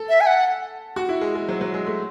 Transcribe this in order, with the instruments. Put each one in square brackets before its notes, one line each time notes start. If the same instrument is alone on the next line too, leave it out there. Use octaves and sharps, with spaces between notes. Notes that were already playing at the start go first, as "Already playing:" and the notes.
Already playing: [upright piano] A4
[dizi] E5
G#5
F#5
[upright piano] F#4
E4
G#3
G#3
F#3
F#3
G#3
A3